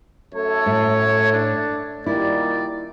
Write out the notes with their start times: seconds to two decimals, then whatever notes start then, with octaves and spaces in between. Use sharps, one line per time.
0.34 F#2 A3 A4 C#5
0.66 A2
1.32 D4
2.06 A#2 D#3 G3 E4 D5